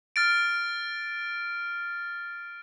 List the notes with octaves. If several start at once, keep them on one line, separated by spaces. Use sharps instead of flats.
F6 A6 D7